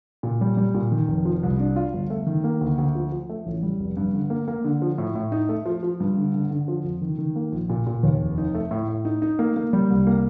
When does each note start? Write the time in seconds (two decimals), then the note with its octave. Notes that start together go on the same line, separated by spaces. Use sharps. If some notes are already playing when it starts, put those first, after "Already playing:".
0.23 A#2
0.41 G3
0.57 G3
0.74 A#2
0.92 D#3
1.08 F1
1.25 F3
1.43 C2
1.59 D4
1.76 F4
1.94 G1
2.10 A3
2.27 D#3
2.44 A#3
2.61 D2
2.78 D2
2.95 F3
3.12 F3
3.29 A3
3.46 A1
3.63 G3
3.80 F1
3.97 G2
4.14 D3
4.30 A#3
4.48 A#3
4.65 D3
4.82 F3
4.98 A2
5.15 A2
5.32 D#4
5.49 A3
5.66 F3
5.83 F3
6.00 G2
6.17 D3
6.34 D3
6.51 D3
6.68 F3
6.84 F2
7.01 D#3
7.18 D#3
7.36 A#3
7.52 A#1
7.70 A#2
7.86 A#2
8.03 D#2
8.20 F1
8.38 D#4
8.54 A3
8.71 A2
8.88 A2
9.05 D#4
9.22 D#4
9.39 A#3
9.56 A#3
9.73 G3
9.90 C2
10.07 A#3